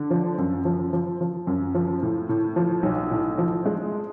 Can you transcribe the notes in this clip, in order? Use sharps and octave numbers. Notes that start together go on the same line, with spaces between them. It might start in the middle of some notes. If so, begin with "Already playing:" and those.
Already playing: D3
F3
F#2
F3
F3
F3
F#2
F3
A2
A2
F3
B1
A2
F3
G#3